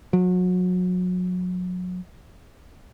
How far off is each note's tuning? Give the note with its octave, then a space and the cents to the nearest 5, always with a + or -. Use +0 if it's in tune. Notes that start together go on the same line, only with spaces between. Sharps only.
F#3 -30